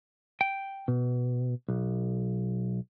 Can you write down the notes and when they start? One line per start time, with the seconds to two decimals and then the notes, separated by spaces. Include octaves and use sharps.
0.41 G5
0.88 B2
1.68 B1